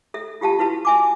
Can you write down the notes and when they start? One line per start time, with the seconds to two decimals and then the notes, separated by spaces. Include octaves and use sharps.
0.14 A4 E5
0.41 F4 G4 F5 A5
0.59 E4 F#4 B4 F5 A5
0.85 E5 G#5 D6